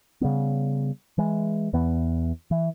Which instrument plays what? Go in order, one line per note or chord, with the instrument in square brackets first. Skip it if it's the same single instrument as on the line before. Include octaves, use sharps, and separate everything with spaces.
[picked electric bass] C#3 G3 B3
E3 G#3
E2 E3 B3
E3